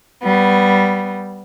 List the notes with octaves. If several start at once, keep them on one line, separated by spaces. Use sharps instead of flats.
G3 B3